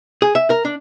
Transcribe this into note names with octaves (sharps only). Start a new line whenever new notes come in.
G#4
E5
A#4
D4